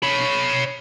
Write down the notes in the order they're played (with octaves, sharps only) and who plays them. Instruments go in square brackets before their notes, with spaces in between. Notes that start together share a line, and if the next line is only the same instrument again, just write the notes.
[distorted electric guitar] C#5 B5